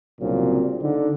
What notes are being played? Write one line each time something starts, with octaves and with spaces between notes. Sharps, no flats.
C2 A#2 C#3 F#3 C4 D4
D3 D#4